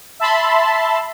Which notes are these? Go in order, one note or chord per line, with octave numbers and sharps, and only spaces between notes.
E5 A5 B5 C6